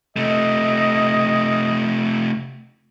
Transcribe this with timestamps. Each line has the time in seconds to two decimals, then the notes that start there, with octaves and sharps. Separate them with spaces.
0.16 C3 A3 D#5